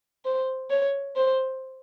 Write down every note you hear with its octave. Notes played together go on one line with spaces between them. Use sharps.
C5
C#5
C5